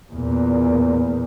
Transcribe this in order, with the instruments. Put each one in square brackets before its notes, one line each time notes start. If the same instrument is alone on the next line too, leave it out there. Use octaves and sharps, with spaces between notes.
[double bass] E2 A#2